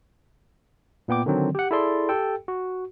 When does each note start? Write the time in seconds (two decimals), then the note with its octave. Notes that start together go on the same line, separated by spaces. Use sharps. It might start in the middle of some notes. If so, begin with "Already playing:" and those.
1.08 A#2 B3 G5 D6
1.26 D3 D#3 F#3 C4
1.55 G4 F#5
1.71 E4 G#4 A4 D5 C6
2.09 G4 A4 G5
2.48 F#4